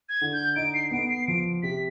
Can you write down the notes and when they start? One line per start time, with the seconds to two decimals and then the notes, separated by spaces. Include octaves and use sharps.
0.09 G#6
0.21 D3
0.33 G6
0.56 D#4 D7
0.74 C7
0.91 B3 D7
1.09 C7
1.27 F3 D7
1.63 C3 B6